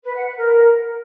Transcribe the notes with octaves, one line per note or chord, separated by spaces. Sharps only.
B4
F#5
B4
A#4